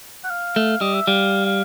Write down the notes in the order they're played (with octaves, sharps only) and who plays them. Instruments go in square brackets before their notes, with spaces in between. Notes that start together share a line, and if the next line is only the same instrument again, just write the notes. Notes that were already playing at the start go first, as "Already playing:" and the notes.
[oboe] F#5
F5
[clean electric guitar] A3
[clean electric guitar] G3 [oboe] D#5
[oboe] E5
[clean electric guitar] G3 [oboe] F5
[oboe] F5